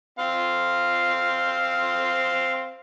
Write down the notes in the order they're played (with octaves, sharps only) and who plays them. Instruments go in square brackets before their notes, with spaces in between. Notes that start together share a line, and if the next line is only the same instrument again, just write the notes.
[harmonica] C4 C5 F5